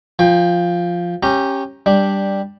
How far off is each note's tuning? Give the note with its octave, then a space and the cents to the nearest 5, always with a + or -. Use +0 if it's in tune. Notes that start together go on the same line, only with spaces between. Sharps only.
F3 +0 G5 +25
C#4 -15 G4 +0 A#5 +0
G3 +0 D4 +0